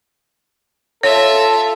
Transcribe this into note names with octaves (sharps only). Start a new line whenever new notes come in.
F4 A4 C#5 E5